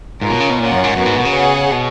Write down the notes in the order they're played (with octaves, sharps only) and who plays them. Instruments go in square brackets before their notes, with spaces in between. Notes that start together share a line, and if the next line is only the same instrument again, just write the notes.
[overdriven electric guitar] G#2 [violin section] F4 A#4 C#5
[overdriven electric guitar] B2
C#3
B2
[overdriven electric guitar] A#2 [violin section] C#4 F4 A#4 C#5 F#5
[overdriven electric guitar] F#2
G#2
[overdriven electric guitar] F#2 [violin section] B3 F#4 A#4
[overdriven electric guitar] G#2
B2
C#3
[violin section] G#4 C#5 F#5
[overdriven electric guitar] B2